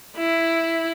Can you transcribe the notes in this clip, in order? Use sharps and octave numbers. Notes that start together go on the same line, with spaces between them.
E4